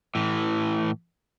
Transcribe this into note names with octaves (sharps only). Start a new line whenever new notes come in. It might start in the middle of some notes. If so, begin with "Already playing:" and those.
A2 E3